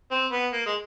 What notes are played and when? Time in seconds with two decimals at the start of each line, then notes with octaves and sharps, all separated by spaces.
0.11 C4
0.32 B3
0.53 A#3
0.66 G#3